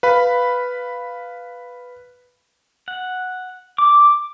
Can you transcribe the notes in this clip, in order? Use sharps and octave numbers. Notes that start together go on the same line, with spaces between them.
B4 F5 B5
F#5
D6